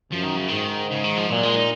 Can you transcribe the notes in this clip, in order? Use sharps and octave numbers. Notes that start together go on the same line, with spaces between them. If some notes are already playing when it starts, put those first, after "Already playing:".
F#2 F3
D#3
C#3
G#2 D#3
C#3
D#3
F3
A#2 F#3
G#3
D#4